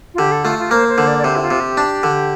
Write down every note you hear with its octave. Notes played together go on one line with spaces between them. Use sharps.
F4
D3 G4
A4
A3 F4
F4
A#3 C5
C5
D3
D5
D5
C3 C5
E4
F4
C3
G4
D4
D3